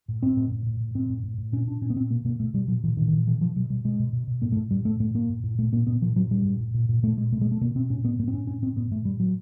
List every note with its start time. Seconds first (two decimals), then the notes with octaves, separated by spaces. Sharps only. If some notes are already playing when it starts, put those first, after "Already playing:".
0.08 A2
0.22 A2 C4
0.37 A2
0.51 A2
0.66 A2
0.80 A2
0.95 A2 C4
1.10 A2
1.23 A2
1.38 A2
1.52 A#2 C#4
1.66 A#2 D4
1.81 A#2 C#4
1.90 B3
1.95 A#2 C4
2.10 B2 A#3
2.24 B2 A#3
2.40 B2 A3
2.53 B2 G3
2.68 A#2 F#3
2.83 A#2 E3
2.97 A#2 D#3
3.08 D#3
3.13 A#2 E3
3.27 B2 E3
3.40 B2 F3
3.56 B2 F#3
3.70 B2 G3
3.84 B2 G#3
3.99 B2
4.13 B2
4.27 B2
4.42 A2 A#3
4.52 A3
4.56 A2
4.71 A2 G3
4.85 A2 A3
5.00 A2 A3
5.14 A2 A#3
5.30 A2
5.43 A2
5.58 A#2 A3
5.73 A#2 A#3
5.87 A#2 B3
6.01 A#2 F3
6.16 A2 F#3
6.31 A2 G3
6.45 A2
6.60 A2
6.74 A#2
6.89 A#2
7.03 A#2 A3
7.17 A#2 G#3
7.32 B2 A3
7.41 G#3
7.46 B2
7.52 A3
7.61 B2 A#3
7.75 B2 C4
7.90 A2 C#4
8.04 A2 B3
8.19 A2 A#3
8.28 C4
8.33 A2 C#4
8.47 A2 C#4
8.62 A2 C4
8.77 A2 B3
8.91 A2 A3
9.05 A2 G3
9.20 A2 F#3